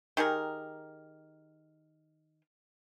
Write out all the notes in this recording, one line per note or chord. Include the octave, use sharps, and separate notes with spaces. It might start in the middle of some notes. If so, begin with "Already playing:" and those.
D#3 G4 G#4 A#4